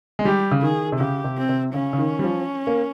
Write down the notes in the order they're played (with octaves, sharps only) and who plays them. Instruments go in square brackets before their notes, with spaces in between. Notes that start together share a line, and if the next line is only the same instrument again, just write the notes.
[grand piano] G#3
[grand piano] G3 [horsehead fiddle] G4
[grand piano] C#3
[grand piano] D#3 [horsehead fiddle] G#4
[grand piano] C3
[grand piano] C#3 [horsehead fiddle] G4
[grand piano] C3
[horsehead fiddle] C4
[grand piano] C3
[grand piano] C#3 [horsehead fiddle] C#4
[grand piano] C#3
D#3
G3
F3
A#3